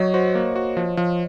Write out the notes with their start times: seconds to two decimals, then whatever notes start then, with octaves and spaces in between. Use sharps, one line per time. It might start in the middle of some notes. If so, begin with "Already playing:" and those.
Already playing: F#3 C#5 D#5
0.14 F#4 C5
0.35 A#3
0.56 F#4
0.77 F3
0.97 F3